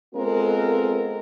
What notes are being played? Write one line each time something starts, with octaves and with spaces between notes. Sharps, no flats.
G#3 B3 C4 F4 A4 A#4